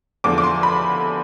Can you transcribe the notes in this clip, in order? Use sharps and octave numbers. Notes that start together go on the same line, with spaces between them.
E2 D3 F3 D6
D6
C6
B5